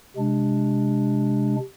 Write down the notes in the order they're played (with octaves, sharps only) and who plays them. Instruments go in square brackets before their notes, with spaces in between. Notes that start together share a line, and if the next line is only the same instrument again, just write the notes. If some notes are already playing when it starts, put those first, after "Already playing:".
[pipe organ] C3 G#3 D4